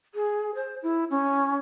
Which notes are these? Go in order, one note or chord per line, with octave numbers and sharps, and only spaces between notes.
G#4
C5
E4
C#4